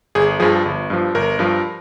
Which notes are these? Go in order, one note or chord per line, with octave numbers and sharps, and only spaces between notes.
G1 G#4
G2 F3 G#4
G1
G2 F3
G1 A#4
G2 F3